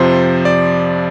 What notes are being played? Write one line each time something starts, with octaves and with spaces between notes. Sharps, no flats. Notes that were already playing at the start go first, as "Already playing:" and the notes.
Already playing: F2 C3 F3 C5
D5